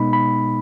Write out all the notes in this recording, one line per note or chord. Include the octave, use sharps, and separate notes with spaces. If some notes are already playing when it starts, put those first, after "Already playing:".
Already playing: B2 G#3 B3 D#4 B5
B5